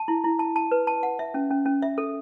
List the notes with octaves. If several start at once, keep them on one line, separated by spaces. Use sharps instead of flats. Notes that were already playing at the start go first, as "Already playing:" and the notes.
Already playing: A5
E4
E4
A5
A5
B4
A5
F#5
E5
C#4
C#4
C#4
E5
A4